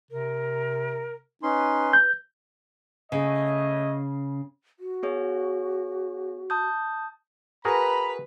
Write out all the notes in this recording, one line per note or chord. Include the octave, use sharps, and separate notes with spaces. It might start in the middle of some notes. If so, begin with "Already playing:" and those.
C3 A#4
C#4 D#4 B4 C6
G6
C#3 A3 C#5 D#5
F#4
B3 G#4 C#5
A5 D#6 G6
F#4 G#4 A#4 B4 A#5 B5